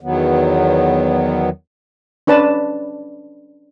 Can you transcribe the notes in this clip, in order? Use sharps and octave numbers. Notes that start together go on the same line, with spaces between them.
E2 D#3 F#3 B3
C#4 D4 B4 A5